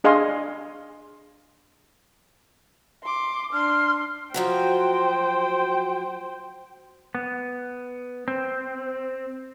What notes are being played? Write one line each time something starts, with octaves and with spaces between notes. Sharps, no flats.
D4 G#4 D#5 F5 G#5 C6
C6 D6
D4 C6 F6
F3 F#3 F#4 C5 G5
B3
C4